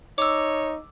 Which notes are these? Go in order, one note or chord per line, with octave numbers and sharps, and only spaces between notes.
D#4 C#5 D6 E6